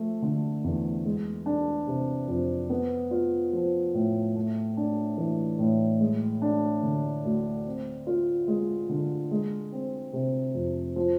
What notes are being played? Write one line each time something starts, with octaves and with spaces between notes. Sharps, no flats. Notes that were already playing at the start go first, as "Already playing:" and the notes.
Already playing: F3 A3
D3
E2
G#3
D4
C3
F2
B3
F4
F3
A2
A3
D4
E3
A2
G#3
D4
D3
D2
C4
F4
G#3
D3
G#3
C4
C3
F2
F3